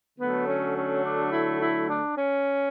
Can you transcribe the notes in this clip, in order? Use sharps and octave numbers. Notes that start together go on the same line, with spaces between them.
D3 F#3 A3 B3
C#4
C#4
D4
E4
E4
D4
C#4